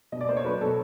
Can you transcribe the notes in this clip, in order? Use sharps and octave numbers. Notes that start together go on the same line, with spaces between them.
B2 D#5
D5
A#3 C5
C#5
F#3 B4
B2 A4